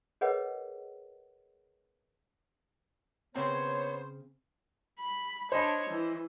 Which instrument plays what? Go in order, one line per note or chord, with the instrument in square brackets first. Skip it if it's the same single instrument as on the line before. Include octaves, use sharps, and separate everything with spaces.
[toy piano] G#4 A#4 B4 C#5 D#5 F#5
[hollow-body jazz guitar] C#3 C4 [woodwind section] B3 C#5 [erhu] C5
[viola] B5
[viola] D4 C#5 [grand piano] C5 D#5 B5
[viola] E3